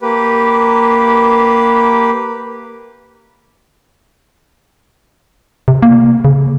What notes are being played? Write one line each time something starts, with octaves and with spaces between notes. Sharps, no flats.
A#3 G4 B4
C3
A#3
C#3